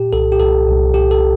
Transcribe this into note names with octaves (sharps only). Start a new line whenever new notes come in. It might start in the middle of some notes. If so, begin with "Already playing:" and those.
Already playing: A#2 G4
C2 A4
G4
C2 A4
C2
C2 G4
A4